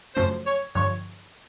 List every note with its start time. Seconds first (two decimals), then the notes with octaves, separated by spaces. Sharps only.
0.16 F#2 C#3 F3 A3 C#4 C5
0.46 C#5
0.75 G2 D3 F3 C#5